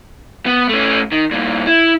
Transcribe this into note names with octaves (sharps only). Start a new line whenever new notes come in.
B3
A3 C#4
D#3
G2 A#2
E4